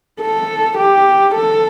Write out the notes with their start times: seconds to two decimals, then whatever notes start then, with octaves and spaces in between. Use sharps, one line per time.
0.21 A4
0.78 G4
1.35 A4